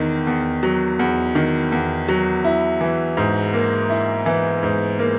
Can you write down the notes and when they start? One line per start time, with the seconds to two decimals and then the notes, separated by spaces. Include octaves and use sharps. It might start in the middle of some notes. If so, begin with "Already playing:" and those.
Already playing: E2 D#3
0.27 E2
0.63 F#3
0.99 E2
1.35 D#3
1.72 E2
2.08 F#3
2.44 E4
2.81 E3
3.17 G#2
3.54 A#3
3.89 E4
4.26 E3
4.63 G#2
4.99 A#3